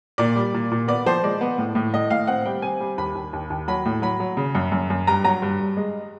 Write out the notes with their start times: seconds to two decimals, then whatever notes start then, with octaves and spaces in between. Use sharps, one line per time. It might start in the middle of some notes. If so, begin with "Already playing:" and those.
0.18 A#2 D5
0.36 G3
0.54 A#2
0.71 A#2
0.88 B3 D5
1.06 F3 C5
1.23 G#3 D5
1.41 B3
1.58 A2
1.75 A2
1.94 A2 D#5
2.10 A2 F5
2.27 C4 F#5
2.45 G3 G5
2.62 C4 G#5
2.80 G3
2.98 D#2 B5
3.15 D#2
3.33 D#2
3.50 D#2
3.68 F#3 B5
3.85 A2
4.02 F#3 B5
4.20 F#3
4.37 C#3
4.55 F#2
4.72 F#2
4.90 F#2
5.07 G2 A#5
5.24 F#3 A#5
5.42 G2
5.60 G2
5.77 G#3